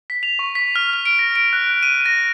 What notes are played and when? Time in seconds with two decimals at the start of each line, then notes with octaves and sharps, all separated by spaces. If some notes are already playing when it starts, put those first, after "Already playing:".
0.10 B6
0.23 F7
0.39 C#6
0.55 B6
0.76 F6
0.93 F6
1.05 D7
1.19 A#6
1.35 D7
1.53 F#6
1.83 D#7
2.06 A#6